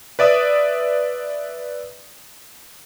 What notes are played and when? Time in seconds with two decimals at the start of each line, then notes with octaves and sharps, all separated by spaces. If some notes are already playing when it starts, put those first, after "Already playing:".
0.19 B4 D5 E5 D#6